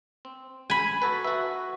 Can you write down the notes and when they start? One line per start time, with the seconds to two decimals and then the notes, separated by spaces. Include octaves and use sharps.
0.25 C4
0.70 G#5 B5
1.02 F#4 A4 B4
1.24 F#4 E5